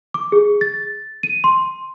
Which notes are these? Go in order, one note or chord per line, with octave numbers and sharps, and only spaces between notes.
D6
G#4
A6
D#7
C6